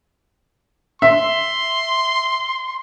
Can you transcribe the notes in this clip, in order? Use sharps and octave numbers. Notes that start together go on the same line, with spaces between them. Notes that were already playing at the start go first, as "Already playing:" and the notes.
E5 C6